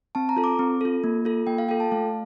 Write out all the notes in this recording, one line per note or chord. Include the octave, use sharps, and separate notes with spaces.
C4 A5
A#5
F4 A4
D6
C4
F4 A4
A#3
F4 A4
A#3 G5
F5
F4 A4 G5
A5
A3 F5